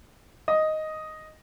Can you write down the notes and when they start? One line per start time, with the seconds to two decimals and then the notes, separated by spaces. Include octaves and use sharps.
0.48 D#5